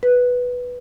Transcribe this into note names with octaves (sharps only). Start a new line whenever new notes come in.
B4